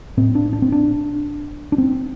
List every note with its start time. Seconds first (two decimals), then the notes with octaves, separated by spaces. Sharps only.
0.17 A2 C4
0.35 D4
0.53 D4
0.62 C4
0.72 D4
1.72 D4
1.78 C4